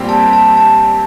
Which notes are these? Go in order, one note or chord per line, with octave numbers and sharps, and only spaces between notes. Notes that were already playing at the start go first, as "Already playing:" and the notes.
Already playing: A#2 G3 C4 G4
A5
A5
A5